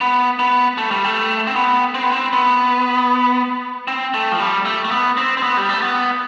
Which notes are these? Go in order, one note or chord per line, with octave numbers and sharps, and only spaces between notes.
B3
B3
A3
G3
A3
C4
B3
C4
B3
C4
B3
C4
A3
F3
G3
A3
A3
B3
C4
C4
B3
G3
A3
B3